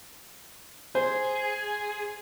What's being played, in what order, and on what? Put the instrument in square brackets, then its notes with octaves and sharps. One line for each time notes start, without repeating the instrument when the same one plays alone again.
[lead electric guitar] G#4 [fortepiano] C5